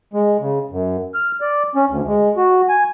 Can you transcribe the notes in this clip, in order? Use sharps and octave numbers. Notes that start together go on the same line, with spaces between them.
G#3
C#3
F#2
F6
D5
C#4
D2
G#3
F#4
G#5